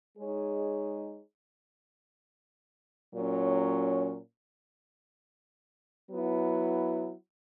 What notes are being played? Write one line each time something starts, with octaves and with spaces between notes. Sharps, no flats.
G#3 D#4 G#4 C#5
A#2 F#3 C#4
F#3 B3 E4